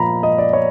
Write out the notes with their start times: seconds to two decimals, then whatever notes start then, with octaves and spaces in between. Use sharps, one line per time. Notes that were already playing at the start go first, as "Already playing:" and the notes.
Already playing: A#2 F3 A#5 B5
0.23 D#5
0.38 D5
0.53 C#5